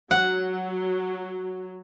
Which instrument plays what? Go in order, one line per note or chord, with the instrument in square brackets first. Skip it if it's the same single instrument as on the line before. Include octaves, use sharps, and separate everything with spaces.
[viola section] F#3 [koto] F#5